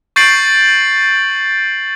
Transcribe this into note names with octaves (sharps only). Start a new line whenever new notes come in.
C#6 G6 A6 C7 D7 F#7